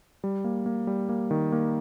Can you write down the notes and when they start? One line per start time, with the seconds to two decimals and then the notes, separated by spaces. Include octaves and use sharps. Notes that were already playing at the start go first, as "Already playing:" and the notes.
0.24 G3
0.44 A#3
0.66 A#3
0.87 G3
1.09 A#3
1.31 D#3
1.52 A#3